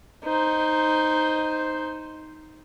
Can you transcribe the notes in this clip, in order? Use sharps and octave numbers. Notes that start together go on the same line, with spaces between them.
D#4 C5